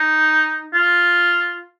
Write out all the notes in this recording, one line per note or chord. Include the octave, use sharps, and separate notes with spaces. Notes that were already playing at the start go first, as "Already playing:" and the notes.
Already playing: D#4
F4